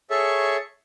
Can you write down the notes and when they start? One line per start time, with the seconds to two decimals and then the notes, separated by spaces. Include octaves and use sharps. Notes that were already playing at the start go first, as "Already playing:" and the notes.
0.10 G#4 A4 C#5 E5 C#6